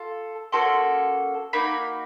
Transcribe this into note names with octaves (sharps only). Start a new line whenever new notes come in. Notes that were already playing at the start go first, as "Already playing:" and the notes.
Already playing: F4 A4
A#3 C#4 F#4 A4 C6
A#3 D#4 F#4 B5